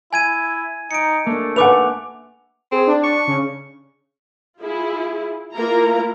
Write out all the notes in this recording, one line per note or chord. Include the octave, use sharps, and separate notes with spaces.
E4 G#5 G#6 D#7
D#4 C#7 D7
A3 A#3 D4
B4 F#5 G#5 D6 F7
C4 G#4
D4
C#6
C#3
E4 F4 G#4
A#3 E4 F4 A#4 A#5